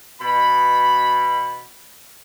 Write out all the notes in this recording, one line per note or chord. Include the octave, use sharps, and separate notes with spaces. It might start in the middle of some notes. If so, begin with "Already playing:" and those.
B2 B5